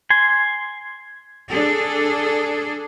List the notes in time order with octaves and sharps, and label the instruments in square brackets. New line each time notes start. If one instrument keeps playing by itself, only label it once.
[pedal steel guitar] G#5 C6
[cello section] D4 G#4 A4